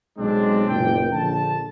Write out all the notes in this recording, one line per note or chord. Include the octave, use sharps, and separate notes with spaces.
B1 G#3 C4 D4
F#1 A#2 G5
A#1 D3 A5